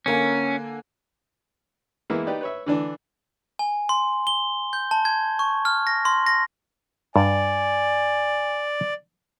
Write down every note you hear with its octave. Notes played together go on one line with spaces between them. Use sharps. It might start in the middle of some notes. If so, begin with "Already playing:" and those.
D3 A#3 C#4 G#5
E3 G#3 A#3 B3 E4
D#4 G4 B4 D5
B4 C#5 E5
D3 E3 D4
G#5
C6
G7
G6
A5
G#6
C#6
F6
A#6
C6
A#6
G2 D5 G#5